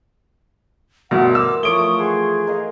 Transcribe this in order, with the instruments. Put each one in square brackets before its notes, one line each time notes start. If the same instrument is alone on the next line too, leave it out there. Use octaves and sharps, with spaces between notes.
[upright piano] D2 G2 B2 [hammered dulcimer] E3 A#4 C5 [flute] F#5
[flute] D6 [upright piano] E6
[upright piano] F3 D7 G7 [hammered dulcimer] A3 C#5 [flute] D#6
[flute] G#4 [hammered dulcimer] F#5 C6 C#6
[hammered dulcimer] A#4 D#5 F5